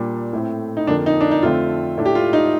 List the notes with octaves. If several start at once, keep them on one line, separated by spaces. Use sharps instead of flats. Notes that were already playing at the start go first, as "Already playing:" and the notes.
Already playing: A#2 G3 A#3 D4
A2 A3 C4
D#4
F2 D3 F3 A#3 D4
D#4
D4
D#4
F2 D3 A3 C4 F4
A2 A3 D4
G4
F4
D#4